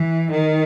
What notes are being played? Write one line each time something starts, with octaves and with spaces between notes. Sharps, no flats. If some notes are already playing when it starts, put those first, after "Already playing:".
Already playing: E3
D#3